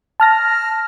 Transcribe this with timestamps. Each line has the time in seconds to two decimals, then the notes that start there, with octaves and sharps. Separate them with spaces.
0.20 A5 F6 A#6